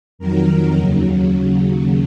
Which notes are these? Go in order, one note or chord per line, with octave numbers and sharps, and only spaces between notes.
F2 D#3 F#3 A#4
D#2 C#3 F#3
D#2 C#3 F#3